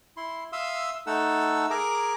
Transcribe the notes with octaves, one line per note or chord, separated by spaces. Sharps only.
E4 C6
E5 F5 C6 D#6 E6
A3 D#4 A4 F#5 E6
G#4 A#4 A#5 D6